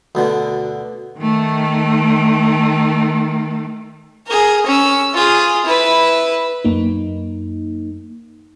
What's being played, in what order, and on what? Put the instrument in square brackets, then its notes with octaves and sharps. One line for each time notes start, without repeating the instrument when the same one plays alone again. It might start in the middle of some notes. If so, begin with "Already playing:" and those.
[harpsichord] D2 B2 D3
[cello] D#3 A3
[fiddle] G#4 A#4
C#4 E6
F4 G#4
E4 B4
[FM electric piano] F#2 A#3 D#4